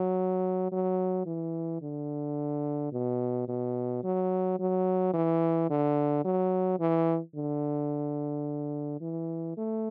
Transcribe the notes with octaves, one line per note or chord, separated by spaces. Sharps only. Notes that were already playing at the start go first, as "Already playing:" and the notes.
Already playing: F#3
F#3
E3
D3
B2
B2
F#3
F#3
E3
D3
F#3
E3
D3
E3
A3